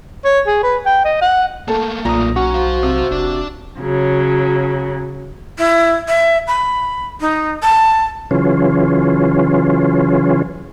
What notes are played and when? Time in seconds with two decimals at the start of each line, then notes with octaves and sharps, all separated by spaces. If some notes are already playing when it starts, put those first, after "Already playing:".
0.25 C#5
0.47 G#4
0.63 B4
0.86 G5
1.05 D#5
1.21 F#5
1.68 A3 A#3 A4
2.05 B1 A#2 A#5 D#6
2.36 C#4 F#4
2.54 C5 F5
2.83 C3
3.11 F1 D4 D5
3.79 C#3 F#3
5.59 E4
6.08 E5
6.48 B5
7.21 D#4
7.63 A5
8.31 C#3 E3 F#3 C#4 F4